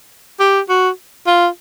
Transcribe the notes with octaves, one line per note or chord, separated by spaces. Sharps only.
G4
F#4
F4